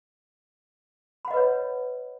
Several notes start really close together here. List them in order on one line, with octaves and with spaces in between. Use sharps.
B5 F#5 D#5 B4 C#5